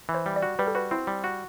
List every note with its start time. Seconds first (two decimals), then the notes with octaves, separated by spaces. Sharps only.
0.09 E3
0.14 C5
0.26 G3
0.36 D5
0.42 F#4
0.59 G3 B4
0.67 A4
0.75 F#4 B4
0.91 C4 E4
1.07 G3
1.24 F#4